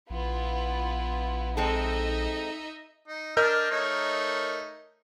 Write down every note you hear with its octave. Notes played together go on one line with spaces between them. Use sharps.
A#1 B3 E4 F4
G#3 C4 D#4 A4 D#5 E5
D#4
D4 A#4 D#5 F6 G6
A3 D#4 C#5